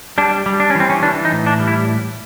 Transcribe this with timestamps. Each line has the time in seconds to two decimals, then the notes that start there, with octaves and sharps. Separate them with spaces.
0.18 G3 D4
0.46 G3
0.60 D4
0.70 C#4
0.75 E3 C4
0.90 C#4
1.03 E3 D4
1.25 D#4
1.32 A2
1.46 D4
1.60 G3
1.67 E4